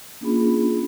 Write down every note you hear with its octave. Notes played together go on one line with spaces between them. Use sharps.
A#3 C#4 D4 F4 G#4 B5